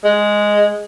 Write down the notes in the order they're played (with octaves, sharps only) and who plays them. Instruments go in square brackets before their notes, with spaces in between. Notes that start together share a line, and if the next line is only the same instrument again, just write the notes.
[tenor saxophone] G#3